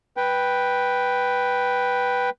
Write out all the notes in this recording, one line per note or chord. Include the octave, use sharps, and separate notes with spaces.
B4 G5